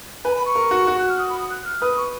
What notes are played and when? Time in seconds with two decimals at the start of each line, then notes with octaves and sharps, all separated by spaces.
0.25 B4 G#5
0.31 A#5
0.35 B5
0.46 C#6
0.55 A#4
0.71 F#4
0.87 F#4
0.99 F#6
1.09 F6
1.19 D#6
1.30 B5
1.39 D#6
1.50 F#6
1.65 F6
1.81 B4 D#6
1.97 C#6